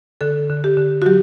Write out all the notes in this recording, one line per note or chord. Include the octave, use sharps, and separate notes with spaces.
D3 A4
D3
G4
D3
F#4
F#3 G4